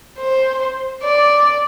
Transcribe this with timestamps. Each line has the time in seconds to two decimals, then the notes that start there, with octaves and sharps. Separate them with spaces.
0.19 C5
1.03 D5